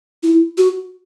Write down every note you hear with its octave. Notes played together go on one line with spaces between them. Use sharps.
E4
F#4